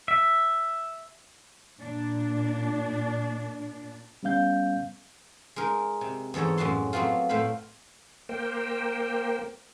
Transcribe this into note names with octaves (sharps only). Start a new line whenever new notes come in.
E5
A#2 D4
G3 B3 C#4 F5 G6
G#3 D#4 A#4
C3
E2 G#2 A4 C#5 A#5
F#2 A2 G#3 F#4 A5 C6
F#3 A3 B3 C4 F4
A2 A3 C5 F5 B5
A#3 A#4 C5 G5